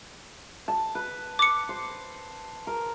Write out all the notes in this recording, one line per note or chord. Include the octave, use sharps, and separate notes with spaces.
A5
B4
D6 C#7
C5
A#4